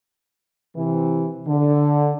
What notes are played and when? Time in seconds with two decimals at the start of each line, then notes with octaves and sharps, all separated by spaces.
0.76 C3 E3
1.47 D3